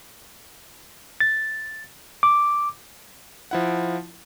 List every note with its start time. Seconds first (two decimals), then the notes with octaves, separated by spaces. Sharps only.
1.20 A6
2.23 D6
3.51 F3 E4 F#5